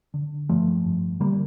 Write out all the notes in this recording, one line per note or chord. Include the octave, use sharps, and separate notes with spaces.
D3
G2 F3 A3
G2
D3 G3 A#3